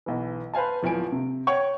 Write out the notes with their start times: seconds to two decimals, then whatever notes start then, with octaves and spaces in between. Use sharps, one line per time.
0.06 B1 E3
0.54 B4 C5 F5 G#5 A5
0.83 D1 F3 E4 G#5 D7
1.12 C3
1.47 C#5 F#5 G5 C#6